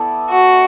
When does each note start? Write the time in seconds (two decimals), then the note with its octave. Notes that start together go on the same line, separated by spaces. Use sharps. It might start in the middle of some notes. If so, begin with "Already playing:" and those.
Already playing: B3 E4 A4 D5
0.30 F#4